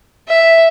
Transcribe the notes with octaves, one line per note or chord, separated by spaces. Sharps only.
E5